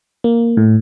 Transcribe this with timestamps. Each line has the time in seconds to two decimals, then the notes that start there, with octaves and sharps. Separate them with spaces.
0.24 A#3
0.57 A2